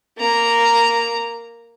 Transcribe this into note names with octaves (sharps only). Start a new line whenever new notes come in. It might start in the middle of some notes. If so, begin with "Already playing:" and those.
A#3 A#5